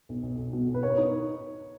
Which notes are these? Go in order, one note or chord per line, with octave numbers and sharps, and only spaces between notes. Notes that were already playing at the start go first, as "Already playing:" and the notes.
B1
B1
B1
B2
B1
B4
A#4 C#5
D#4